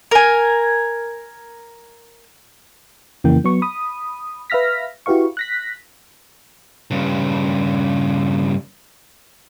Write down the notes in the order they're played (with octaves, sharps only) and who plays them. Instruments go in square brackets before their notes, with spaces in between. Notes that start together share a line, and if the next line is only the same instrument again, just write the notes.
[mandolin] A#4 G#5
[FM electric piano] F2 C#3 E3 A#3 G5
F#3 B3 C#6
B5 D#6
B4 E5 F5 F6 A#6 B6
E4 F#4 G4 B4 F5 C#6
F#6 A#6 B6
[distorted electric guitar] G2 C#3